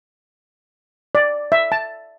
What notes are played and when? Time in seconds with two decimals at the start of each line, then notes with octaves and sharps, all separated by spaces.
1.15 D5
1.52 E5
1.72 A5